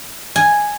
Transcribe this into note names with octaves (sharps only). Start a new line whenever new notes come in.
G#5